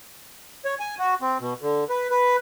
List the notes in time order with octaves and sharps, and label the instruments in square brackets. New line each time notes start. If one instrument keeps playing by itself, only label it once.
[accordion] C#5
G#5
F#4
C4
B2
D3
B4
B4